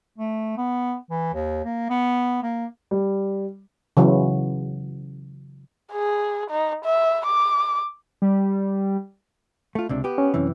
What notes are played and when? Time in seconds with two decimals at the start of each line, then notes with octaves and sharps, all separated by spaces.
0.18 A3
0.57 B3
1.10 E3
1.34 D#2
1.65 A#3
1.90 B3
2.43 A#3
2.91 G3
3.97 C#3 E3 F#3
5.92 G#4
6.50 D#4
6.85 E5
7.26 D6
8.22 G3
9.75 A3 F4
9.89 C#2 C3 D4
10.04 B3 G4
10.18 C#4
10.34 F#2 C3 E3